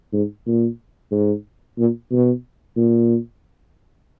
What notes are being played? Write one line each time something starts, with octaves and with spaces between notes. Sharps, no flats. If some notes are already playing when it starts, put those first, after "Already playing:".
G#2
A#2
G#2
A#2
B2
A#2